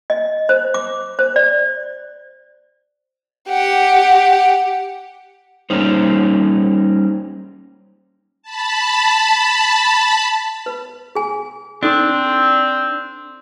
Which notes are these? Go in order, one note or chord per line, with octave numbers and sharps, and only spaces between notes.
D#5
C5
D6
C5
D5
G4 F#5
G3 A#3 C#4 D#4 C5
A5 B5
B4
G#4 G#5
C4 D4 D#4 A4 C6